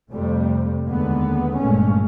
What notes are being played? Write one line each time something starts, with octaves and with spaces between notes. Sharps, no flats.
F2 C3 G3 A3
D#2 D3 G#3 B3
G1 G2 A#2 G#3 A3 C#4